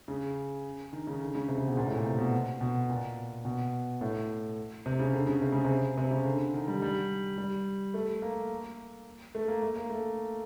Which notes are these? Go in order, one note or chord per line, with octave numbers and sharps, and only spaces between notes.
C#3
D#3
C#3
D3
C#3
C3
C#3
B2
A#2
A2
A#2
C3
B2
B2
A#2
B2
A2
C3
C#3
D3
C#3
C3
C#3
C3
C3
C#3
D3
D#3
G3
G3
G3
A3
A#3
A3
A#3
A3
A#3
A3